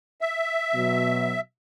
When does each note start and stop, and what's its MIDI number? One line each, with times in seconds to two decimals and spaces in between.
0.21 1.40 76
0.74 1.36 47
0.74 1.36 54